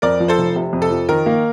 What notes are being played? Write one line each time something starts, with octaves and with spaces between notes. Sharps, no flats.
F2 A#4 D5
F3
A4 C5
F1
C3
F2
A4
F3
D#3 A#4
A#3